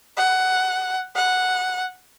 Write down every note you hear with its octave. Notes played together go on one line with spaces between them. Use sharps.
F#5
F#5